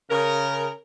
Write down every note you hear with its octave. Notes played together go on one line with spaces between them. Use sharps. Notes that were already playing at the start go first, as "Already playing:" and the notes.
C#3 A#4